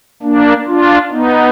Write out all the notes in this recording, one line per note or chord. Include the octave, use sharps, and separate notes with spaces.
A#3 D4
D4 F4
B3 D#4